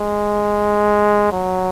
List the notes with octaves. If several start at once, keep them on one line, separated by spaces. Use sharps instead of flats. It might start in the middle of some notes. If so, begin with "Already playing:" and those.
Already playing: G#3
F#3